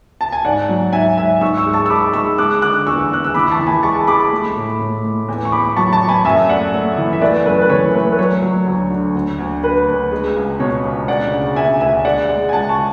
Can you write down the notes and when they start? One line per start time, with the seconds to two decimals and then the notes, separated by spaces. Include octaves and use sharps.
0.21 A5
0.32 G#5
0.45 G#2 D5 F#5
0.69 F#3
0.93 G#2 E5 G#5
1.18 G#2 E5 G#5
1.41 G#2 C#6 E6
1.57 C#6 E6
1.66 G#3
1.73 A5 C#6
1.86 E6
1.90 G#3 B5 D6
2.14 G#3 C#6 E6
2.38 G#3 D6 F#6
2.62 D3 D6 F#6
2.86 E2 C#6 E6
3.11 E2 F#6
3.24 E6
3.35 E3 B5 D6
3.51 A5 C#6
3.59 E3
3.67 G#5 B5
3.83 G#3 A5 C#6
4.07 G#3 B5 D6
4.32 A3
4.55 A2
4.79 A2
5.04 A2
5.28 E2
5.45 C#6
5.52 E2 B5 D6
5.76 F#3 A5 C#6
5.93 A5 C#6
6.01 E2
6.08 G#5 B5
6.25 F#2 E5 G#5
6.49 A3 D5 F#5
6.73 A3
6.97 E3
7.13 E5
7.21 A3 B4 D5
7.46 F#2 B4
7.62 B4
7.70 E3 C#5
7.94 A3 B4
8.12 B4
8.18 F#3 C#5
8.42 F#3
8.66 D2
8.90 D3
9.15 D2
9.39 D2
9.63 D2 B4
9.87 D2
10.12 G#3
10.36 C#2
10.60 B2 C#5
10.84 C#2
11.08 D2 D5 F#5
11.32 C#3
11.56 D2 E5 G#5
11.81 D2 E5 G#5
12.05 G#3 D5 F#5
12.29 G#3
12.49 G#5
12.53 C#2 F#5 A5
12.69 A5 C#6